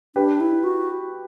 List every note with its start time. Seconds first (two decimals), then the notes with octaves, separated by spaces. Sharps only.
0.16 D4 G4 B4
0.40 E4
0.64 F#4